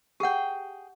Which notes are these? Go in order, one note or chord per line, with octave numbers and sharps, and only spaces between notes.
G4 G#4 F#5 G5